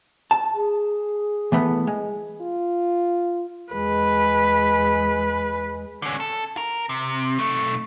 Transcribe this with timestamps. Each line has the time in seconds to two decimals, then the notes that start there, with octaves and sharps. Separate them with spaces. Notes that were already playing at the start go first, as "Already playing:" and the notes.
0.31 A5
0.55 G#4
1.52 E3 A3 B3
1.87 G#3
2.42 F4
3.73 E2 G#3 B4
6.02 D3 C#4
6.20 A4
6.57 A#4
6.89 C3
7.39 B1 A3